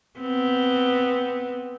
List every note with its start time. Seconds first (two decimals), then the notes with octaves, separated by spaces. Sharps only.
0.19 B3 C4